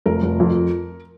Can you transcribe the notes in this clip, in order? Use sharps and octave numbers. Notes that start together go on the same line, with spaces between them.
F1 A#4
F1
F2